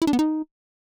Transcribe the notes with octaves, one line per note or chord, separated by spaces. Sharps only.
E4
D4
B3
D#4